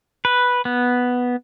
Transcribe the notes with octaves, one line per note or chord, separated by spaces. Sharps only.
B4
B3